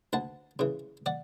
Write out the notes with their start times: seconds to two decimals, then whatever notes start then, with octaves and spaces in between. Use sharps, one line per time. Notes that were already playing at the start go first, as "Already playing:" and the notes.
0.13 D2 F#5 A5
0.59 C#3 E3
1.06 D5 F#5